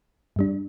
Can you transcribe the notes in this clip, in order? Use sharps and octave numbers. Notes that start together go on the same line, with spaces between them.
G2 G3 D4